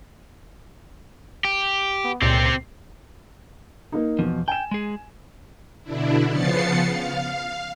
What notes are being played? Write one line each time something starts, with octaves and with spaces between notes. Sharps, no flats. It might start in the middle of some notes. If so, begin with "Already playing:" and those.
G4
B3
C#2 A#2 C4 G4 A6
A#3 D#4
E2 B2 F3
G5 G#5 E7
G#3 G#4
B2 D3 D4 E4
C#3 F3 B3 A6 C7 C#7
F5